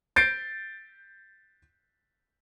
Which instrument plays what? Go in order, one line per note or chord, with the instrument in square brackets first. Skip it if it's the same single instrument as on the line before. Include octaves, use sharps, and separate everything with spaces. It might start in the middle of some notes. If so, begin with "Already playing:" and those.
[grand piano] G6 A6 C7 D7